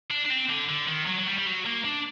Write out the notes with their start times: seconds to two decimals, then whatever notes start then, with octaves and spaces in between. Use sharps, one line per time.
0.11 D4
0.25 D4
0.30 C4
0.50 D3
0.69 D3
0.89 D#3
1.07 F#3
1.19 F#3
1.27 G3
1.38 G3
1.47 F#3
1.66 A#3
1.85 D4